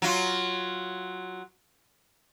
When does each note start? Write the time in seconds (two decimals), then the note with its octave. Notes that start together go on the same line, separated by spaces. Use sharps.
0.02 F#3 F4